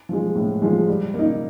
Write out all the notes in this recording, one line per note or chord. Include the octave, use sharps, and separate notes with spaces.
F3 G#3
A2
F3 G#3
G3
A#3
D#4